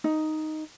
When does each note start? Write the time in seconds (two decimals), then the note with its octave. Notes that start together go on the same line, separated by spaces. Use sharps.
0.04 D#4